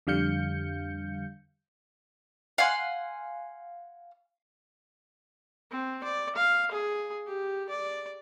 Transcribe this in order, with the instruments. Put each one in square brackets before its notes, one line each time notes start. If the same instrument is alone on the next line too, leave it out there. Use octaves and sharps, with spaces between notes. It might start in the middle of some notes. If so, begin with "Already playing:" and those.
[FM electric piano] F2 D3 G3 F5 G6 C#7
[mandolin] F5 F#5 G#5 C6
[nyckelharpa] C4
D5
F5
G#4
G4
D5